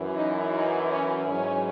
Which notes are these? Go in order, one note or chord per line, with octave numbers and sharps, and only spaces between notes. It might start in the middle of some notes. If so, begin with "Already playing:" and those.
Already playing: F#2 E3
D#4
D#4
C#4
G#2 F#3 C#4